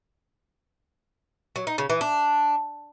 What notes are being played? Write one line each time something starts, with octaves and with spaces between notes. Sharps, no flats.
F#3
D#4
C#3
E3
D4